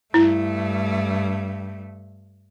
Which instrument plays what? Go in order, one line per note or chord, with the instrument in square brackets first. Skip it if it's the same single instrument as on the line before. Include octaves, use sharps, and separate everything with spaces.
[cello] G2 A3 [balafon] E4